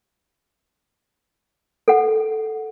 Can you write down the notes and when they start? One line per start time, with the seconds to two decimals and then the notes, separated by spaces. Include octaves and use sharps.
1.88 A4 F#5